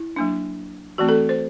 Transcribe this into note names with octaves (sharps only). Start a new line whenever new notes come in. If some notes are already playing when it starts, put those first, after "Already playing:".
Already playing: E4
F#3 A#3 D4
E3 A3 C4 F#4
A4
C5